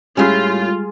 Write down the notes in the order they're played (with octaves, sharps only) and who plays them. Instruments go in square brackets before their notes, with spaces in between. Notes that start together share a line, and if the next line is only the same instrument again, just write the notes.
[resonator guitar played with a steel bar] A2 C#4 [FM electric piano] G3 G#3 G4 [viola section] F4 [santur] G#4